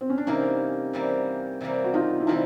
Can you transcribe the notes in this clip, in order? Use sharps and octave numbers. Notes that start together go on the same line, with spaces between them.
C4
C#4
D4
C3 E3 G3 A#3 C#4 D#4
C3 E3 G3 A#3
C3 E3 G3 A#3
F#4
D#4 F4
E4
C3 E3 G3 D#4 F4